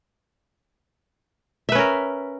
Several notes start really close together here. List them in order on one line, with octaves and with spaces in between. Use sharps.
E5 B4 C#4 A#4